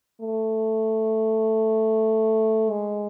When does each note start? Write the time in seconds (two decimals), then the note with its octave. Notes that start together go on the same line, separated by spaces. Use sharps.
0.21 A3
2.70 G#3